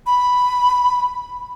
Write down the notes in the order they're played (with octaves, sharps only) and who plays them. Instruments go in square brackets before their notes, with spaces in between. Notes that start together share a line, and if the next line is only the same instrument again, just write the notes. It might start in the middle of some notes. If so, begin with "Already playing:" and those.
[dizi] B5